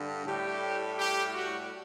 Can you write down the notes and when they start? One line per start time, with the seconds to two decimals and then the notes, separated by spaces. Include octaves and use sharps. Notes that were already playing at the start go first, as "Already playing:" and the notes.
Already playing: G2 D3
0.25 A2 G3 G4
0.98 G4
1.33 F#4